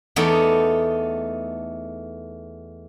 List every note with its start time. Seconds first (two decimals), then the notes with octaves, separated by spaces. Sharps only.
0.16 E2 A3 B3 D#4 D5